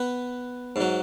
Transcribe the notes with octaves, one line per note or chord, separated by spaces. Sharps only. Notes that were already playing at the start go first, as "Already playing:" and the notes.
Already playing: B3 B4
G#2 F#3